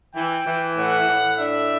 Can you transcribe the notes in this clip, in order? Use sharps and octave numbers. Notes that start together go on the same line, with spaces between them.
E3 G5
E3
A2 F#5
A2
D4 E5